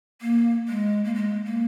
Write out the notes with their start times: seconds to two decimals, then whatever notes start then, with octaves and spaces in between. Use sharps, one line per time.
0.21 A#3
0.68 G#3
1.05 A#3
1.15 G#3
1.45 A#3